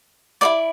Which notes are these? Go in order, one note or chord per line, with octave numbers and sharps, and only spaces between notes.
E4 A4 D5 D6